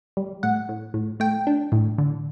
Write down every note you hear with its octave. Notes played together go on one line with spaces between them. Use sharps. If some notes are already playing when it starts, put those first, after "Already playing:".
G3
A2 F#5
A2
A2
A3 G5
D4
A2
D3